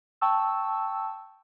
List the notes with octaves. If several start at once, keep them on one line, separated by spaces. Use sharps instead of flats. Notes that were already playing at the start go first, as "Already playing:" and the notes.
G5 A5 C#6 E6